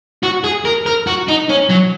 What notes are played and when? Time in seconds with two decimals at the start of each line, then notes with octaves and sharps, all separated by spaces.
0.23 F#4
0.44 G#4
0.65 A#4
0.86 A#4
1.07 F#4
1.28 D#4
1.50 C#4
1.70 F#3